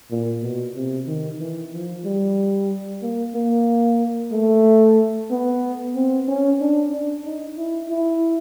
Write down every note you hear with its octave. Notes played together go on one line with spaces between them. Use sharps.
A#2
B2
C3
D#3
E3
F3
G3
A#3
A#3
A3
B3
C4
C#4
D4
D4
D#4
E4
E4